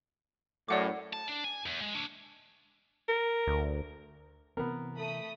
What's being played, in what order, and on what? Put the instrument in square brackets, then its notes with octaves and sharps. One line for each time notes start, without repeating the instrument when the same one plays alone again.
[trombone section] F#2 A2 [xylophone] D5 F#5 D6
[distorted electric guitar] A5
D4
G#5
E2
G#3
D4 C#5
[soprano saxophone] A#4
[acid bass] D2
[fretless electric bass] C3 E3 C4 [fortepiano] B3 A#4
[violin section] A3 B5 D#6